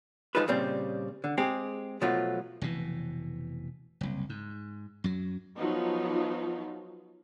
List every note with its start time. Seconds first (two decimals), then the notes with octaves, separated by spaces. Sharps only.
0.35 F3 G#3 D#4 F4 A4 B4
0.48 A#2 C#3 G3 C4
1.24 D3
1.38 G#3 C4 G4 G#4
2.01 B2 F3 F#3 A3 F4
2.62 F1 B2 E3
4.01 F#1 C2
4.29 G#2
5.04 F#2 F#3
5.57 F3 F#3 B3 D#4 F4